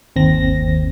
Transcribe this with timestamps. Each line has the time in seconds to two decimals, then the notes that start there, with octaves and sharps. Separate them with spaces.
0.16 G1 D#2 C4 A#6